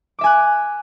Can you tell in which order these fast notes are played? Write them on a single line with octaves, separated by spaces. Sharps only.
D6 E5 G#5 F#6